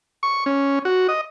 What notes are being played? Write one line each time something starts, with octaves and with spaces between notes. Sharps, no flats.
C#6
C#4
F#4
D#5